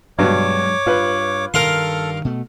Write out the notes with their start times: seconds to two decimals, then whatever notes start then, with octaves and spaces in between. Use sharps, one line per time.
0.19 G2 B2 F#3 G#3 C#5 D6
0.86 G2 F4 B4
1.54 G2 D#3 A4 A#4 F5 C6
2.25 B2 A3